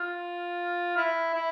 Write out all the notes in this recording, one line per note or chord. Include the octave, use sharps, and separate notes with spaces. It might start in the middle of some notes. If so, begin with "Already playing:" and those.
Already playing: F4
E4
E4